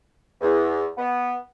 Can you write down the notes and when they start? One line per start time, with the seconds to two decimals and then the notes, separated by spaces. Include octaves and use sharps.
0.41 E2
0.97 B3